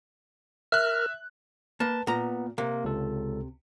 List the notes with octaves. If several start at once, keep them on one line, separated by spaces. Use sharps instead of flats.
A#4 E5 F6 F#6
A#3 B4 A5
A#2 B3 A#5
C3 A#3
C#2 A4